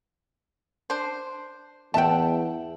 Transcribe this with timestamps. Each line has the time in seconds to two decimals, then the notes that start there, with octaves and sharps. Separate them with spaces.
0.90 D4 C5
1.94 E2 E5 F#5 G5 A5